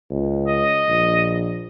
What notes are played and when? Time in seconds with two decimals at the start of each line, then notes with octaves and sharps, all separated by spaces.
0.11 C#2
0.48 D#5
0.88 A#1